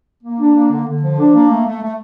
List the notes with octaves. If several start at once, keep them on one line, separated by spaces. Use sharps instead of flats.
A#3
D4
A#3
D3
D3
F3
D4
A#3
A3
A3
A3